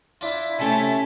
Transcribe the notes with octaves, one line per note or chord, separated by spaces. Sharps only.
D4 E4 F4 E5
C3 A3 C#4 A5